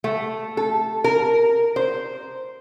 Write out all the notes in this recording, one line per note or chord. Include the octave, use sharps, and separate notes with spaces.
A3
A4
A#4
C5